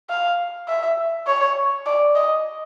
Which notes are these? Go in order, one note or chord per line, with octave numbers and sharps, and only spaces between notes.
F5
E5
C#5
D5
D#5